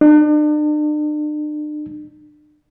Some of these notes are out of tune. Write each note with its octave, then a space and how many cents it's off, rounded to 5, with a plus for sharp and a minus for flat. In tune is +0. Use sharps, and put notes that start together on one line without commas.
D4 +40